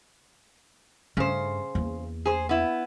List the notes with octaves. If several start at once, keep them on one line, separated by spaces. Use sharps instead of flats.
G2 C#3 A3 C5
E2 A#3
G#4 C5
B3 E4